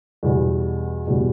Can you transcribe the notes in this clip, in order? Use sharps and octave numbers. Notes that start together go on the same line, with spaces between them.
E2 B2 G3
E2 B2 G3 B3